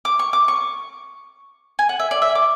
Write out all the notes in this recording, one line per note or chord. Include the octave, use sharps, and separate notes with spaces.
D6
C#6
D6
C#6
G#5
F#5
E5
D5
E5
D6